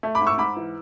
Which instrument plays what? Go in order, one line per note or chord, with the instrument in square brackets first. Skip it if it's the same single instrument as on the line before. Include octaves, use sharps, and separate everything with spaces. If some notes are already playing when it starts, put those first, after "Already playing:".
[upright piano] A3
B5 D6
G#2
C#6 E6
G#2 B5 D6
E3